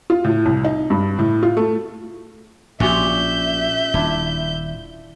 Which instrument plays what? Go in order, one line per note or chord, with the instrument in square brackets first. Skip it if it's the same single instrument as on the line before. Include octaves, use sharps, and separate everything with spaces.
[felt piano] F4
A2
C2
D#4
G2
A2
F4
A3
[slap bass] A#1 [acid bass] A#2 [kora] C#4 F#4 G4 [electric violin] E5 G6
[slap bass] D#1 [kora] D4 E4 F4